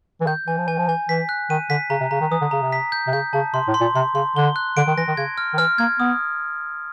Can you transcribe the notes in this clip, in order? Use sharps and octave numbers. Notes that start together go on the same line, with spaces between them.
E3
D#3 G6
E3 G#5
F3
E3 G#5
F3
E3 G#5
E3 B6
F#6
D#3 D#7
D3 B6
C#3 A#5
C3
C#3 A#5
D#3
E3 D#6
D3
C#3 A#5
C3
B6
G6
C3
C#3 G6
C#3 A5
C3 C6
A2
C6
A#2
C3 C6
C#3 C6
D3 G7
F#6
D3 D7
D#3
E3 A#6
D#3
C#3 G#6
F6
D#3
E3 F6
A#3 G#6
B3 D#6